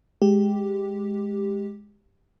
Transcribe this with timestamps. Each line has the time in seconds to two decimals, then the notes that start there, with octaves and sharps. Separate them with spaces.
0.22 G#3 G4